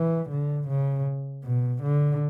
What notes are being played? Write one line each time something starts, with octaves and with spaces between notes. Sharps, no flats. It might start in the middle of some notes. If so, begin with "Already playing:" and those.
Already playing: E3
D3
C#3
B2
D3